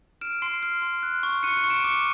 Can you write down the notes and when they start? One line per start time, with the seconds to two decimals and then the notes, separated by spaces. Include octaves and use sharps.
0.21 F6 D7 E7
0.42 C6 C7 D7
0.63 F6
0.82 C6
1.03 F#6
1.23 C#6
1.43 F#6 C#7 D#7
1.56 C#7 D#7
1.64 C#6
1.70 D7 E7
1.83 D6 C#7 D#7